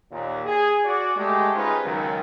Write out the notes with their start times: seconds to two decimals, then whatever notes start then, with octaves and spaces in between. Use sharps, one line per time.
0.10 D#2 A#2
0.45 G#4
0.84 F#4 D5
1.16 G#3 A3 G4
1.55 C#4 D#4 F4 G#4 B4 C5
1.84 C#2 D#3 F#3